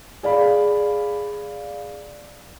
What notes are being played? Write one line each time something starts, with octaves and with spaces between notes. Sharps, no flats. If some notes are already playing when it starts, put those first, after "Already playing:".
G#4 D5 F5 B5